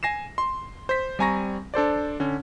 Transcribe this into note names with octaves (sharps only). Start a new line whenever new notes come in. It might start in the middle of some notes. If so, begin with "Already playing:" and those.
G#5 A#6 C7 E7
C6
C5 B6
G3 C4 G#5 A#5 C#6 A#6
D4 A4 C5 D5
D3 C#4